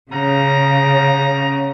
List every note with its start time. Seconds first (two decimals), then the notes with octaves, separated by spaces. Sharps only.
0.11 C#3 G3 F#5 A#5